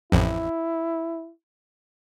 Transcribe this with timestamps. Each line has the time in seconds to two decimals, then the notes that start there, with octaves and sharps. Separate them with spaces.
0.12 A1 F2 E4